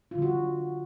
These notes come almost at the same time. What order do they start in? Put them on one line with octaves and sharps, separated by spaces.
F4 D3 G3 F#4